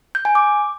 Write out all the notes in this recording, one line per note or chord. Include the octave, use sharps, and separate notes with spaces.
G6
G#5
D6